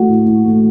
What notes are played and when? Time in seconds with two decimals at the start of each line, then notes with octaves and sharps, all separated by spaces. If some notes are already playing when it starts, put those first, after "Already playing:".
Already playing: A3 F#4
0.08 A2
0.26 A2
0.46 A3